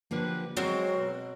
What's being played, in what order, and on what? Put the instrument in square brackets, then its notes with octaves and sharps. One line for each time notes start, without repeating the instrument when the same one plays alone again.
[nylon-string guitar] D3 F3 A#3 [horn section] F#3 G4 B4
[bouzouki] F#3 C4 A#4 [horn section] G#3 [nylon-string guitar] F#4
[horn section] B2